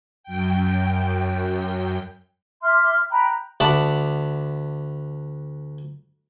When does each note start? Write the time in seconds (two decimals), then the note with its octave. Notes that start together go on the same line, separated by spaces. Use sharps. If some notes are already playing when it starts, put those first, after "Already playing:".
0.24 F#2 G5
2.62 E5 C6 D6 F6
3.10 G5 A#5 B5 F#6
3.60 D2 F#5 A5 B5 D6